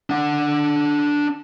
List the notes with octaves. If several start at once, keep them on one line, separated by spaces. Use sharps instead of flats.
D4 F#5